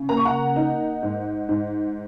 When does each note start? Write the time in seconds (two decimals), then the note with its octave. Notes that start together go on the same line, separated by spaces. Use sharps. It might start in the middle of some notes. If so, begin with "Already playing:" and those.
Already playing: C#3
0.09 A#3 A#5
0.17 C#6
0.25 F#5 A#5
0.56 D#4
1.03 G#2
1.49 G#2